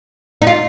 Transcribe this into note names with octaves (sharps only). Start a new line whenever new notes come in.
D#4
F4